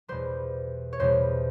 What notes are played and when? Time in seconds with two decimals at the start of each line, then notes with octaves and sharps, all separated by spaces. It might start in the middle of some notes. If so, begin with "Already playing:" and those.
0.08 E2 B2 G3 C5
0.93 C#5
1.00 E2 B2 G3 C5